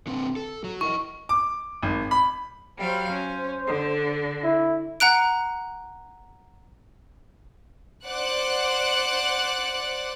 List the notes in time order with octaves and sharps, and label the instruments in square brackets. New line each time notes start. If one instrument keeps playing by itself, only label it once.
[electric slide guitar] D3 C4 B4
A4
F#3
[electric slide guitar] E4 A#4 D#5 [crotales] C#6
[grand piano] D6
G#1
B5
[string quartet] F#3 G3 F5 [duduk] C5
[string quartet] C#4
D3
[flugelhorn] E4
[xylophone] F#5 A#5 F#6 D7
[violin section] C5 D5 F#5 D6 F#6